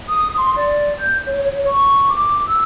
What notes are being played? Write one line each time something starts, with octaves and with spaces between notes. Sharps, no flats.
D#6
C6
D5
G6
C#5
C#5
C#6
D6
E6